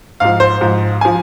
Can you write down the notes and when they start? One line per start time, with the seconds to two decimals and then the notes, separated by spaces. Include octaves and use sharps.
0.20 G#2 F3 F5
0.40 C5
0.61 G#2 F3
1.01 F3 G#5